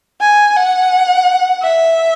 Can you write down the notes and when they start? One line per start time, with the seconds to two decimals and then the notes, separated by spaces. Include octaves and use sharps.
0.21 G#5
0.56 F#5
1.63 E5